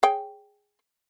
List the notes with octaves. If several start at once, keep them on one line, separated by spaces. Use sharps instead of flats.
G#4 C#5 G5